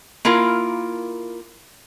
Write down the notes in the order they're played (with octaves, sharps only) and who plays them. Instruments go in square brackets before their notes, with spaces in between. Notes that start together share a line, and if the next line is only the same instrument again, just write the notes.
[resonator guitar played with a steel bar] A#3 E4 F4 A#4